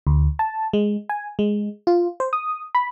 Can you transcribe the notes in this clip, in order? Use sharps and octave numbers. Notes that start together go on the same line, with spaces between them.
D2
A5
G#3
G#5
G#3
F4
C5
D#6
B5